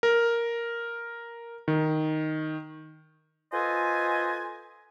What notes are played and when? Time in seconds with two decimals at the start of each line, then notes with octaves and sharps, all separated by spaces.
0.03 A#4
1.68 D#3
3.53 F4 A4 B4 C5 D#5 G#5